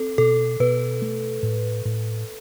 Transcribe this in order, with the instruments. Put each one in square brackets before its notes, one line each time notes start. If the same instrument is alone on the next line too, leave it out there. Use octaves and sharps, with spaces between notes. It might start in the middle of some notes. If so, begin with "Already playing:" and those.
Already playing: [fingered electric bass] C4 [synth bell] A4
[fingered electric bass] B2 [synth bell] A4
[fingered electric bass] B2 [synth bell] B4
[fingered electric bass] A3
A2
A2